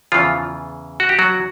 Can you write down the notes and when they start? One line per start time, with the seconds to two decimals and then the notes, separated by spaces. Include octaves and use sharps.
0.12 E2 C#3 E3 F3 F4
1.00 F#4
1.09 G4
1.19 F#3 F#4